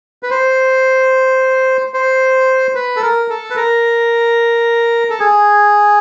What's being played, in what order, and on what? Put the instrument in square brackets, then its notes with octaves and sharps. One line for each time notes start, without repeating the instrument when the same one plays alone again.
[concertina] B4
C5
C5
B4
A4
A#4
A4
B4
A#4
A4
G#4